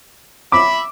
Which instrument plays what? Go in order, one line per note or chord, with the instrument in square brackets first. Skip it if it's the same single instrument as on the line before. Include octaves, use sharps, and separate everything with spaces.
[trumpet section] E5 B5 [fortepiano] D6